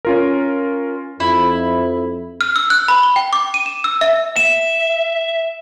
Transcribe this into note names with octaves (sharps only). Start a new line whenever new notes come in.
C#4 F4 A#4
F2 E4
F6
E6
F#6
B5
G7
G5
D6
D#7
E7
E6
E5
E5 E7